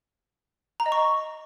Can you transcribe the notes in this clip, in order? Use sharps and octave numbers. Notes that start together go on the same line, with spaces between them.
A#5
D#5
C#6